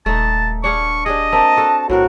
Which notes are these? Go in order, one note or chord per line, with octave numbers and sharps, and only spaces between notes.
D#1 A3 D#4 A5
D4 G#4 F5 C#6
D4 G4 G#4 D#5
A#3 C4 E5 A5
F#4 A4
B1 A2 C4 F#4 A#4